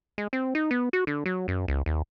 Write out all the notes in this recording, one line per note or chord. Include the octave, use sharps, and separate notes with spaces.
G#3
C4
D#4
B3
F#4
D3
F#3
F#2
C#2
D#2